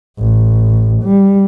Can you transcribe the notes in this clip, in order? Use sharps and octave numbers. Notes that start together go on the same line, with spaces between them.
A1
G3